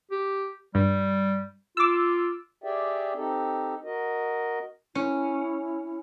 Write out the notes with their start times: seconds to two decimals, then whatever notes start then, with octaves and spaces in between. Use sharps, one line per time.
0.11 G4
0.75 G2 G3
1.77 F4 D6 E6
2.64 G4 G#4 D5 E5 G5
3.16 C4 D#4 G4 A4
3.84 F#4 A#4 D#5
4.95 C#4 E4